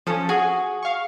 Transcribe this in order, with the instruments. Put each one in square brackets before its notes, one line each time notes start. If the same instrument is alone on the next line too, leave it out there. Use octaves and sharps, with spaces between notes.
[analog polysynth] F3 C#4 [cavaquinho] A4 D#6
[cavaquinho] F#4 [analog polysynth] G#4
[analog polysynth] F5 C#6